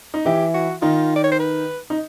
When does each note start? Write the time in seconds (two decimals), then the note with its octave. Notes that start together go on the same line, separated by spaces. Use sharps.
0.14 D#4
0.25 E3 E4 G4
0.54 F#4
0.82 D#3 D#4 F4
1.16 D5
1.24 C#5
1.32 C5
1.39 B4
1.90 D#4